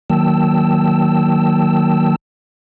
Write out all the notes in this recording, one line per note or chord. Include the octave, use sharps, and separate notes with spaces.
D#3 F#3 A#3 G5 A5 E6